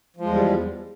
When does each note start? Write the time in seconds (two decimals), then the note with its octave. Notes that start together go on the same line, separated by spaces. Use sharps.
0.17 F3
0.21 G#3
0.25 E2
0.29 G3